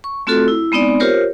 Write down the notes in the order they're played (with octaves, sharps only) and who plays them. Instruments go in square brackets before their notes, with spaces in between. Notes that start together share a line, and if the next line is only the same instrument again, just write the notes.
[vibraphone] C#6
A3 C4 F4 F#4 A4
E4
G#3 B3 C4 D#4 D5
F4 G4 A#4 C5 C#5